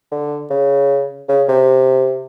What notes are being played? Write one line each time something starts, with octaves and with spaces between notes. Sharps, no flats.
D3
C#3
C#3
C3